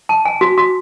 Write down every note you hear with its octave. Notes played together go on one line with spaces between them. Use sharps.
A5
G#5
F#4
F#4